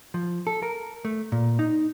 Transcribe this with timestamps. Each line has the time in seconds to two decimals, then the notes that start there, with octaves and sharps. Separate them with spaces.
0.14 F3
0.47 A4
0.63 A#4
1.05 A3
1.32 A#2
1.59 D#4